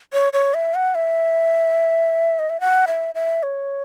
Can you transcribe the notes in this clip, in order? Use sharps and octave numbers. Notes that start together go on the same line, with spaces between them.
C#5
C#5
E5
F#5
E5
D#5
E5
F#5
E5
E5
C#5